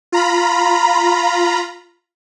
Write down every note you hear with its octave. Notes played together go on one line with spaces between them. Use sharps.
F4 A#5 B5